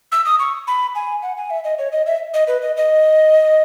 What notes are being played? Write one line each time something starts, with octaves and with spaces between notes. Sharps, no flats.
E6
D#6
C#6
B5
G#5
F#5
G#5
E5
D#5
C#5
D#5
E5
D#5
B4
D#5
D#5